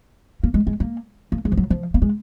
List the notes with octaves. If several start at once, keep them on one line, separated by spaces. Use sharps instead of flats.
A#3
G#3
G#3
A#3
A#3
G#3
F3
F#3
F3
A#3
G#3